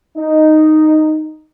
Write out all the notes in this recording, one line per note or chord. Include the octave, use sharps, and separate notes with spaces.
D#4